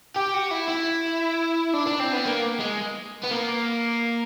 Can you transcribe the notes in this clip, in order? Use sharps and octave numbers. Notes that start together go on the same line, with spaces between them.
G4
F#4
E4
E4
D4
D4
C4
B3
A#3
G#3
B3
A#3